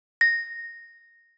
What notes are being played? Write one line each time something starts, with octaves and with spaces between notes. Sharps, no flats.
A#6